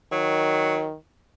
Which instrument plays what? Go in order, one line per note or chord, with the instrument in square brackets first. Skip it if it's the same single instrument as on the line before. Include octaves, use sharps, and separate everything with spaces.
[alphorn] D#3 [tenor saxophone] F#3